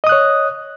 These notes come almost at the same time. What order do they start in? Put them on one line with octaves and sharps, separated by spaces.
D#5 D#6 F#6 C#5